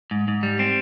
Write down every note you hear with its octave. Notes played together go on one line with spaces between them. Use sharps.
G#2
G#2
G3
C4